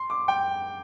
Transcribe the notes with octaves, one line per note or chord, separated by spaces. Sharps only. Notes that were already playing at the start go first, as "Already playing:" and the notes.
Already playing: C6
D6
G5